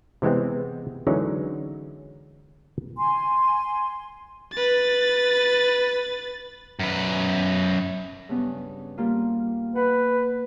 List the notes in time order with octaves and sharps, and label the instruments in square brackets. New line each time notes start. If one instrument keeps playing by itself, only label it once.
[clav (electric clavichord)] C3 E3 G#3 B3 C4
D3 E3 F#3 G#3 C#4 D#4
[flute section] G#5 C6
[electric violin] B4 A6
[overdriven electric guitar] F#2 B4
[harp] G2 C#3 B3
G3 A#3 F4
[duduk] B4 [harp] F#5